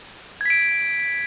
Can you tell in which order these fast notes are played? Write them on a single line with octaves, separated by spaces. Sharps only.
G#6 B6 D7